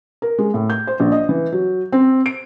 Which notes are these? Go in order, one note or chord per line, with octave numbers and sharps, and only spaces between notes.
A#4
G#3
A2
G6
C5
A#1
D#5
E3
F#3
C4
D7